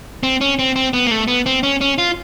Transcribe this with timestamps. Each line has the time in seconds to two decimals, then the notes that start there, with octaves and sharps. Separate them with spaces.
0.23 C4
0.41 C#4
0.59 C4
0.76 C4
0.93 B3
1.07 A#3
1.11 A3
1.28 B3
1.46 C4
1.63 C#4
1.81 C#4
1.98 F4